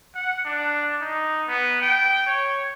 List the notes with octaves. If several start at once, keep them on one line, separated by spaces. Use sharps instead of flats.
F#5
D4
D#4
B3
G5
C#5